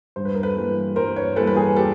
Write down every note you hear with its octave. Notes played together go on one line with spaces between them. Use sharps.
G2 C5
B4
A#4
A4 B4
E3 G3 A#3
G2 A#4 C5
B4 C#5
E3 G3 A#3 A4 B4
B4
G#4 A#4
G4 A4